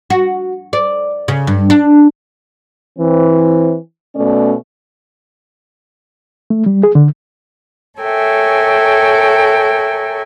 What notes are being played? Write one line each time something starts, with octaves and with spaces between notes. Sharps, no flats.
F#4
D5
C#3
G2
D4
E3 C4
B2 A3 C#4 D5
A3
G3
G#4
D3
A4 A#4 C#5 E5 G5 G#5